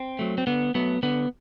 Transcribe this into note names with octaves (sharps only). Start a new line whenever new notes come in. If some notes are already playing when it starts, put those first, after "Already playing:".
Already playing: C4
F#3 A3
C4
D3 B3
F#3 A3 B3
D3 B3